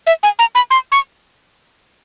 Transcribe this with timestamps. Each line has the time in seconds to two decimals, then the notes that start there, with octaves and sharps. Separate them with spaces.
0.07 E5
0.23 G#5
0.39 A#5
0.55 B5
0.71 C6
0.92 C#6